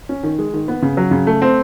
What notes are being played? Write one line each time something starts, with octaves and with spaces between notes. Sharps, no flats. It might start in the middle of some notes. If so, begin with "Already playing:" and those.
C#4
D#3
G#3
D#3
B3
C#3
F#3
C#3
A3
C4